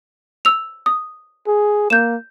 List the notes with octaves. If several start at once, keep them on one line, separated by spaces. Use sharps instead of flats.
E6 F7
D#6
G#4
A#3 G6 E7